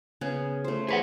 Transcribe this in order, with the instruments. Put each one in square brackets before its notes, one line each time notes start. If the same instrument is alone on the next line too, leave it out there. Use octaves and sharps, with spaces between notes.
[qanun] C#3 B3 G#4
A3 C5
[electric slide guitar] G#4 B4 F#5 [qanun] C#5